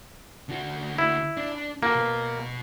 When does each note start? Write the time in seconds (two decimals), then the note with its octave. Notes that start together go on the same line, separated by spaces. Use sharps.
0.49 D3 F#4
0.98 E4
1.37 D4
1.83 A#3 F#4 A4
1.95 B2 B4